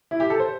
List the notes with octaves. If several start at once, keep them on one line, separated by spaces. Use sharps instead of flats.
E4
G4
A4
C5